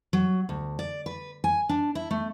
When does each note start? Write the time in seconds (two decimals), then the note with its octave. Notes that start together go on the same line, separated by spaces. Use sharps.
0.13 F#3
0.49 D2
0.79 D5
1.06 B4
1.44 G#5
1.69 D4
1.95 E4
2.11 A3